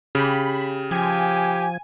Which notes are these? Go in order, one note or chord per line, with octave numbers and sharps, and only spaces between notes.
C#3 G4 B5
F3 G4 G#5